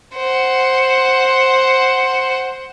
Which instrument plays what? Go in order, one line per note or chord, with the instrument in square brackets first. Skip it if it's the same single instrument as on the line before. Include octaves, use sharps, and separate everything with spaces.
[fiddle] C5 F#5